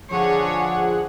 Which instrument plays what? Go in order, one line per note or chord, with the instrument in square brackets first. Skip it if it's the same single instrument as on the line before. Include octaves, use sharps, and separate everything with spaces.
[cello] D3 C#5 [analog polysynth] F3 G#4 F#5